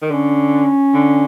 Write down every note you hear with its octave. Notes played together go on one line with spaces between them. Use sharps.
D#3
D3 C#4
D3